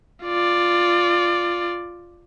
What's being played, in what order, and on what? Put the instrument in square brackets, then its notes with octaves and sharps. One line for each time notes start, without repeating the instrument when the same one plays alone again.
[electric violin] F4 D5